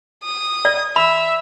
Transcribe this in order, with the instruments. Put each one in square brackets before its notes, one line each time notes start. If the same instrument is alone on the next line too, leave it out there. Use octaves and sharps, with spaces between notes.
[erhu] D#6
[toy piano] D5
[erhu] E5 [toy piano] B5